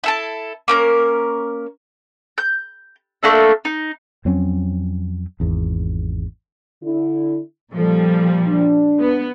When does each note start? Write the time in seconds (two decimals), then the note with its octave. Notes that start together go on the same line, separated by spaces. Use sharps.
0.04 E4 A4 A5
0.68 A#3 C#4 A#4
2.38 G6
3.23 A3 A#3 D4 E5
3.65 D#4
4.25 F2 F#3 C4 C#4
5.40 G#1 E2
6.83 D3 E4
7.74 A#2 F3 G3 A4
8.48 D4
8.99 B3